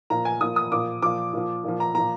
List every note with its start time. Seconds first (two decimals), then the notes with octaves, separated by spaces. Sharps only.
0.10 A#2 F3 A#5
0.25 G#5
0.41 A#2 F3 D#6
0.56 D#6
0.72 A#2 F3 D6
1.02 A#2 F3 D6
1.33 A#2 F3
1.64 A#2 F3
1.80 A#5
1.95 A#2 F3 A#5